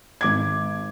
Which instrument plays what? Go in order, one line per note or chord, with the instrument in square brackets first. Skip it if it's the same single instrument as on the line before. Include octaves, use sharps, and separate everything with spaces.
[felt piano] G#1 D6 G#6